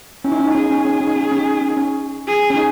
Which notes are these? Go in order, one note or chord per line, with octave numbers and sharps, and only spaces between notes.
C#4 E4
D#4
C#4
D#4
C#4 G#4
D#4
C#4
D#4
C#4
D#4
C#4
D#4
C#4
D#4
C#4
D#4
C#4
D#4
C#4
D#4
C#4
G#4
C#4
D#4